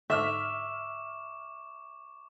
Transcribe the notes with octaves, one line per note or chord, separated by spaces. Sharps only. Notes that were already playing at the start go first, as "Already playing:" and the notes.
G#2 D3 E5 C#6 D6 F6 B6 E7